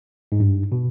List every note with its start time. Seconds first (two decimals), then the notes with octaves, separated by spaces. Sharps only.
0.32 G#2
0.40 G2
0.72 B2